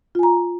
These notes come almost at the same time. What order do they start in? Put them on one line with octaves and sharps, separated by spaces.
F4 G#5 A#5